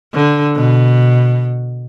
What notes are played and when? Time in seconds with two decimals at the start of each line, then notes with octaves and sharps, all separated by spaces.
0.14 D3
0.56 B2